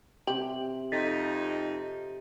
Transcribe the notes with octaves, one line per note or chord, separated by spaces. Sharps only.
C3 G4 C5 D6 F#7
F2 D#4 A4 A6 B6